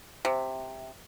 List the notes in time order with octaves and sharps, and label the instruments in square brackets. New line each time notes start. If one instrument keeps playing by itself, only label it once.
[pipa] C3